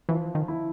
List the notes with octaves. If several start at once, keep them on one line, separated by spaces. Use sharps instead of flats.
E3 F3
D#3
E4